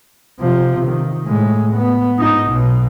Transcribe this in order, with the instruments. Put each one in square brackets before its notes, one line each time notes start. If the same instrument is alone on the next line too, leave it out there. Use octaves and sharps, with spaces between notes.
[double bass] C3 F3
D#3
A2 G#3
B3
G#2 D#4
B1 B2